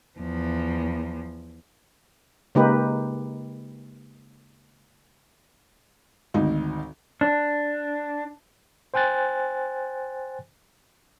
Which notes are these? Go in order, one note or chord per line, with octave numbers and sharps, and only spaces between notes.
E2 F3
C#3 G#3 A#3 D#4 G4 B4
G#1 D2 D#4
D4
C5 G5 G#5 F#6 A6